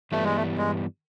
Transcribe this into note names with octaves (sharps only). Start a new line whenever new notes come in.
G2 E3 G3 A3 B3
G#3
A3
G#3